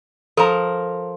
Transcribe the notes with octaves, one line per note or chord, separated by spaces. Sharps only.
F3 A4 A#4 A#5